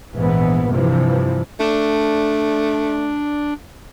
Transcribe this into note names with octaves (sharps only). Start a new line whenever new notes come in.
A#1 G#2 E3 B3
G2 C3 E3 F3
A3 D4